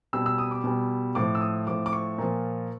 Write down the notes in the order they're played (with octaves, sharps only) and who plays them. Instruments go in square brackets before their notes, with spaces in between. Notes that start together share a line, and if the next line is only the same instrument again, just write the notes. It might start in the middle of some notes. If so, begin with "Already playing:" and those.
[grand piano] B2 G3 E6
E6
D#6
D6
B2 G3
A2 F3 D6
E6
D#6
A2 F3 D6
D6
C#6
A#2 F3